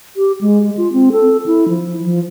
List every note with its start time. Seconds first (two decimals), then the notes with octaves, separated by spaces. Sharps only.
0.16 G4
0.41 G#3
0.77 F4
0.92 C4
1.12 A4
1.46 E4
1.69 F3
2.05 F3